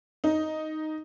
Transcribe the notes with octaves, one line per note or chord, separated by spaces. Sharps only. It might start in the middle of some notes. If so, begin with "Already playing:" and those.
D#4